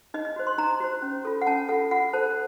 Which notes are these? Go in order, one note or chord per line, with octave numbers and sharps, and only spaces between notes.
D#4 D#5
D#5
F#4 C5
C6
D#4 A#5
F#4 C5
C#4
F4 A4
F#5
C#4 A5
F4 A4 F#5
F4 F#5
A4 C5 A5